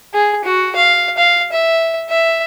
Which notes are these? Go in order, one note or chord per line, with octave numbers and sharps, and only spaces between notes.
G#4
F#4
F5
F5
E5
E5